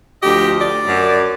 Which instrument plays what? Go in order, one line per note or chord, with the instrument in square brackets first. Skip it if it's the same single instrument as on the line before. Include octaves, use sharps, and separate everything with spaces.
[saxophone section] D2 F3 D#5 [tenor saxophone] G4
[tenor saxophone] D5
[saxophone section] F#2